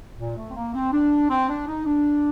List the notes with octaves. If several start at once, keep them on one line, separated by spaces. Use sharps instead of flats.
A#2
A3
C4
A#3
C4
D4
C4
D4
D#4
D4